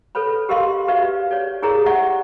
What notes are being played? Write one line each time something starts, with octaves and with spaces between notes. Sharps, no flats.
A4 B4 C#5 B5
G4 A#4 D#5 F5 C6 C#6
F#4 G4 B4 D5 E5 F5
C#5 D5
E4 G4 G#4 A#4 C#5 A#5
D5 E5 F#5 C#6